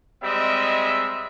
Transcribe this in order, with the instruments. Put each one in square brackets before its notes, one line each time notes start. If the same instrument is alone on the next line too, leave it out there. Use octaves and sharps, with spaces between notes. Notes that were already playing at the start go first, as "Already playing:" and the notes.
[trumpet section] G3 G#3 C4 D#5 E5